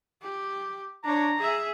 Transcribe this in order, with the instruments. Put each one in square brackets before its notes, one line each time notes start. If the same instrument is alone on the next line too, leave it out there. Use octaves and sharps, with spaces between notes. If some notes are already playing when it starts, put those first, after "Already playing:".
[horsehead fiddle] G4
[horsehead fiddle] D4 C#5 [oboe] A#5
[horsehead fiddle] G#4 E5